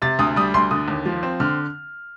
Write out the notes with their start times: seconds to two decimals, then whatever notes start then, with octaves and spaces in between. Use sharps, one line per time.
0.02 C3 A6
0.19 D2 D#6
0.36 G3 D#6
0.54 D2 C6
0.71 D3 D#6
0.88 D#2
1.06 F3
1.23 C4
1.40 D3 F6